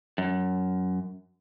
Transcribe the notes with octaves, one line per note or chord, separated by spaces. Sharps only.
F#2